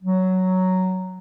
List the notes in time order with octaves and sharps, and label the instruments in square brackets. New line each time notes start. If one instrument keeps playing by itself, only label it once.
[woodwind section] F#3